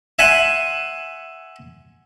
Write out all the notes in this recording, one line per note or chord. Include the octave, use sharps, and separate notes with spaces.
E5 F#5 G#5 B5 C6